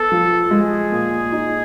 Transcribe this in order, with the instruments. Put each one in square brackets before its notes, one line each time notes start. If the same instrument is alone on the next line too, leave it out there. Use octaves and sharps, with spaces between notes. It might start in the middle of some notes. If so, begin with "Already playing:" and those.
Already playing: [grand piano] B3 [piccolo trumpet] A4
[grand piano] F3
[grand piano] G#3 [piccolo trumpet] G#4
[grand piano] A#2
D#4